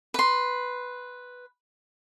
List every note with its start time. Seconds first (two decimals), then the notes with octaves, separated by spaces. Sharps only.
0.14 B4 C6